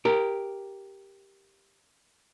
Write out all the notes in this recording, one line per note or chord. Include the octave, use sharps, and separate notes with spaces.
G4 A#4